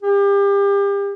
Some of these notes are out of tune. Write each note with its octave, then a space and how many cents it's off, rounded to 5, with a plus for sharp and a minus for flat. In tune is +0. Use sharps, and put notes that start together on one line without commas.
G4 +35